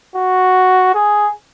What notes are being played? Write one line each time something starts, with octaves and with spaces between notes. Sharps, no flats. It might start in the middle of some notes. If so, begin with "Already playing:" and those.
F#4
G#4